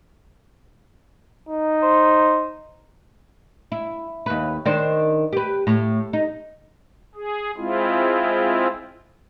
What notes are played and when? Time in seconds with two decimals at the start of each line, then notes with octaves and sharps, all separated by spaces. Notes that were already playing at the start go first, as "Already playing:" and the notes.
1.49 D#4
1.83 C5
3.72 E4
4.26 D#2 B4
4.66 D#3 D4 C5
5.33 G4 B4
5.67 A2
6.13 D#4
7.15 G#4
7.57 G#3 C4 E4 F4